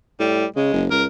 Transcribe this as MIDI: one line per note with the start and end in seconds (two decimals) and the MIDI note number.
0.20 0.45 45
0.20 0.46 55
0.56 0.73 49
0.56 0.84 56
0.73 0.87 30
0.91 1.06 37
0.91 1.04 70